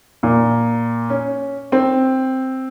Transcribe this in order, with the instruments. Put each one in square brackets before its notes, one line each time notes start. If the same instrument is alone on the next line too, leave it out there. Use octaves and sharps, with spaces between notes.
[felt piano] A#2
C#4
C4